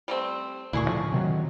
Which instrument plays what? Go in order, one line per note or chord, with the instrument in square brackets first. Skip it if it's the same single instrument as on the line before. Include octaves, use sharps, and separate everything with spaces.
[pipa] G3 A3 C4
[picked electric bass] D2 A#2 [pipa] E4 G#4 C#6
[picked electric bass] A2 D3 F3
C3 D#3 F#3